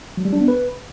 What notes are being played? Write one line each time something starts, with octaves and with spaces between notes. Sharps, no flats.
F#3
G3
D4
B3
B4